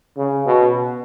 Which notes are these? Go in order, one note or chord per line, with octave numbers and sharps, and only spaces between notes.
C#3
B2